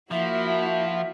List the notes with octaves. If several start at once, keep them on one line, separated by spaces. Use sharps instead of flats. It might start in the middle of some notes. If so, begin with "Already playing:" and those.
F3 A#3 E4 F#4 E5